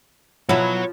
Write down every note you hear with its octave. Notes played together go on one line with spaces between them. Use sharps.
B2 F3 F#3 E4 C#5 F#5